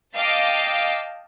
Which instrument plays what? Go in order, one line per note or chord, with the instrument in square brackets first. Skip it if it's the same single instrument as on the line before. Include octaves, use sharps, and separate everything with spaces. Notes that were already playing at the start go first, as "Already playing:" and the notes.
[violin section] D#5 F5 G5 A5 D6